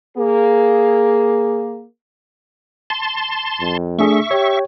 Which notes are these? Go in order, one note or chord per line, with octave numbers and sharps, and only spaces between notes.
A#3 G#4
A5 C6
F2
A3 D4 G#4 E5 C#6
G4 C#5